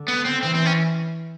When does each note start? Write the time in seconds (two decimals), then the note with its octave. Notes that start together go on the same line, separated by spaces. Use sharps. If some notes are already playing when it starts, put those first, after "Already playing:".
Already playing: D3
0.08 B3
0.25 C4
0.43 E3 C4
0.55 C4
0.66 C#4